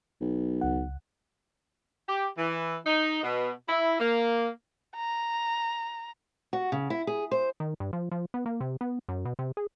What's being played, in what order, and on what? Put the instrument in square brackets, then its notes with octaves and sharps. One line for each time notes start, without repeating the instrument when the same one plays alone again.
[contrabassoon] B1
[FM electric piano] C#2 F#5
[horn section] G4
E3
D#4
B2
E4
A#3
[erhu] A#5
[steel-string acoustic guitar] F#4
C#3
E4
G#4
C5
[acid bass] D#3
G2
F3
F3
B3
A#3
C3
B3
F#2
B2
C3
G#4